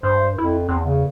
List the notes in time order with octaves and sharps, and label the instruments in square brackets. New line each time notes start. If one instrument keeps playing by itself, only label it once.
[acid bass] G2 [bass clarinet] C5
[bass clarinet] F2 [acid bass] E4
[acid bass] E2 [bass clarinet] C4
[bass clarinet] C#3